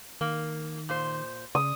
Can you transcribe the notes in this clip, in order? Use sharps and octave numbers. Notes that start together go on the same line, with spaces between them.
D#3 A#3
A#2 C5
C#3 D#6